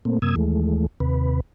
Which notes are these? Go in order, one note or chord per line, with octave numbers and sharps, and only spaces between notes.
A#2 A3 A#3 C4
F#2 C3 A#3 D#6 E6 G#6
D#2 E3 G#3 A3
D#2 C3 B4